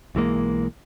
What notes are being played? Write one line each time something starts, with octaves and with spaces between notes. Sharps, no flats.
B1 E3 G#3 A#3